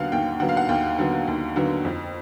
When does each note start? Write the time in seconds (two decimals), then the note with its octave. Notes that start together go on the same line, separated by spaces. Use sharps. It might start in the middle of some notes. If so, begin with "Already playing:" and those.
Already playing: D#2 D3 F#3 B3 F5 F#5
0.12 D#2 G5
0.40 D3 F#3 B3 F#5
0.49 F5
0.57 F#5
0.69 D#2 G5
0.99 D3 F#3 B3
1.28 D#2
1.56 D3 F#3 B3
1.85 F2